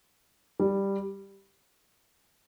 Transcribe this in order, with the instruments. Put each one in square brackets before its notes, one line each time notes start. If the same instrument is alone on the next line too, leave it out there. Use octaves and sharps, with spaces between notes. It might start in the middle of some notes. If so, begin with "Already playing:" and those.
[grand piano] G3